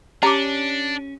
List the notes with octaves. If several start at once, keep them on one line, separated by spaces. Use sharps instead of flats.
C#4 D4 G4 A5 A#5 D6